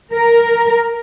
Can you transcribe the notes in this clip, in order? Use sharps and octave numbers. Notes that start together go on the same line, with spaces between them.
A#4